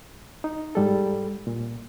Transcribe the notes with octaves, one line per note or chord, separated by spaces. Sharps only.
D#4
G#2 G3 A4
A#2